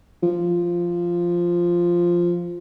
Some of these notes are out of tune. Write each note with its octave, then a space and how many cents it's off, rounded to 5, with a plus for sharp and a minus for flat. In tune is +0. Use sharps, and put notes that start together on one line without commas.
F3 -5